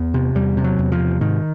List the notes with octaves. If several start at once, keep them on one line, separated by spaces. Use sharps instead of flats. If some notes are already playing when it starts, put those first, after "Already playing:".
Already playing: E2 B3
C3
E2 G3
C3
F#3
E2
F3
C3
G#2 D#3